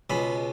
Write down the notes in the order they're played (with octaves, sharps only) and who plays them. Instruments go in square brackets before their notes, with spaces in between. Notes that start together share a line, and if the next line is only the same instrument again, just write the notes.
[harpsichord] C#2 B2 G#3 B5